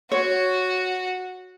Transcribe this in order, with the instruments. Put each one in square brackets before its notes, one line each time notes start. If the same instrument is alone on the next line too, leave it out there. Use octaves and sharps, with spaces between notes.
[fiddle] F#4 [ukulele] C#5